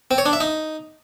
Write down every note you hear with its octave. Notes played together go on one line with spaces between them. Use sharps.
C4
C#5
D4
E5
D#4